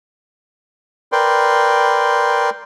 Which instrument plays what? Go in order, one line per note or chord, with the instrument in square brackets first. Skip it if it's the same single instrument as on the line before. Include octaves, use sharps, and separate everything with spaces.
[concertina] A#4 B4 D5 G5 C6